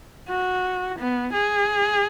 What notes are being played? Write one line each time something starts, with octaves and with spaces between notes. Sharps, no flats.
F#4
B3
G#4